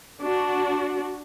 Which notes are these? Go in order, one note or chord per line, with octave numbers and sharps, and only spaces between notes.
D4 F#4